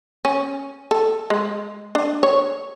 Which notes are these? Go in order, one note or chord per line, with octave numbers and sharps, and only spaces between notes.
C#4
A4
G#3
D4
C#5